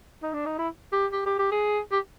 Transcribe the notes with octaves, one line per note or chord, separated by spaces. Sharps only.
D#4
D4
D#4
E4
G4
G4
G4
G4
G#4
G4